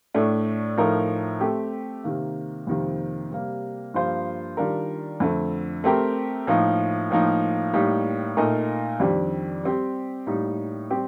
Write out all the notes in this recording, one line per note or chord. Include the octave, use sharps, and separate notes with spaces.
A2 A3 D4
A2 F3 A3 D#4 A#4
A3 C4 G4
C3 D#3 A#3
F2 C3 D#3 A#3
C3 G3 A#3
G2 F3 A#3 F4 C5
D#3 G3 D4 F4 A#4
F2 D3 A3
A3 C4 G4 A#4
A2 F3 A#3 D#4
A2 F3 A#3 D#4
A2 G3 A#3 D#4
A#2 A3 D#4 A#4 D#5
F2 D#3 G3 D4 G4
G3 C4 G4
A2 G3 A#3 D#4
G3 C4 G4